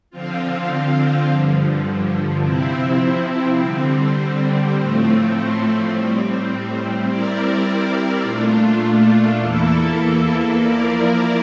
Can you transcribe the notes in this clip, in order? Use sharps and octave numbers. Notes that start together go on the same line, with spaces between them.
D3 F3 C4 F4
G2 D3 F3
C3 F3 C4 E4
D3 G3 C4
A2 F3 A3 C4
A2 G3 C4
G3 C4 E4 A#4 D5
A#2 A3 D4 F4
E2 E3 A#3 E4 A4
F3 A#3 E4 A#4 D5